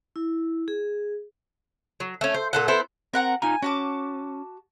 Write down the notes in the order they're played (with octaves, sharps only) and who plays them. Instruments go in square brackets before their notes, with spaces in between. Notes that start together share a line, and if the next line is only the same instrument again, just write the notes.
[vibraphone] E4
G#4
[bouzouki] F#3
A3 C#4
C5
A#2 A4 F#5
B3 E4 A4 C5
[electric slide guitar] C4 [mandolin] A#4 F#5 A#5
[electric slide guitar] D#4 F4 A#5 [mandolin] G#5
[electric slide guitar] C#4 [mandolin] F#4 A5 D6